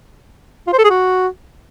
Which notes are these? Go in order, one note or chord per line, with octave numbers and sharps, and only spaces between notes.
F4
C5
A4
G#4
F#4